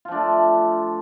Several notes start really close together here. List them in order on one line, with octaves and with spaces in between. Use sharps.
F4 F3 D4 A3